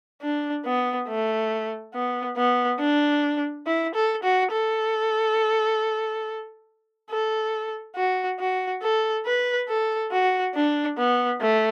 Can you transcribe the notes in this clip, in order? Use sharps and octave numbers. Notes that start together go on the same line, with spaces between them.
D4
B3
A3
B3
B3
D4
E4
A4
F#4
A4
A4
F#4
F#4
A4
B4
A4
F#4
D4
B3
A3